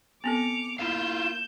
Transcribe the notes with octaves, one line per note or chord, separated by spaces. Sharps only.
B3 C4 A4 D6 C#7 F7
A#3 E4 F4 F5 G6 E7